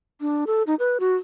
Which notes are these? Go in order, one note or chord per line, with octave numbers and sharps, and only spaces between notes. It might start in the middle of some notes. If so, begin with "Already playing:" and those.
D4
A4
D#4
B4
F#4